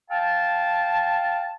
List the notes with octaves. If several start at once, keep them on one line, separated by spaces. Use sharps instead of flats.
F5 G5 A5